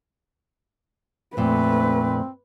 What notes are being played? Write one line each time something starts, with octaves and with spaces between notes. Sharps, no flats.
F2 A#2 A3 C4 B4